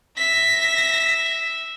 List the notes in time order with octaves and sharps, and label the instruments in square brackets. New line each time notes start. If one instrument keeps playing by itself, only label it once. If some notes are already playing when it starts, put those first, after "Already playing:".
[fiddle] E5 [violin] A#6 B6